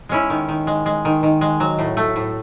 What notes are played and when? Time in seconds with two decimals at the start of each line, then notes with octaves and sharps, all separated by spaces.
0.09 G#3 C#4 E4
0.30 D#3
0.48 D#3
0.67 G#3
0.86 G#3
1.05 D#3
1.23 D#3
1.41 G#3
1.60 F#3
1.79 A2
1.97 A3
2.16 A2